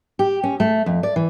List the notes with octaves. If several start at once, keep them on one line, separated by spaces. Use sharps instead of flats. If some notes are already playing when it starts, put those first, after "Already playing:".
G4
C#4
A3
F2
D5
E3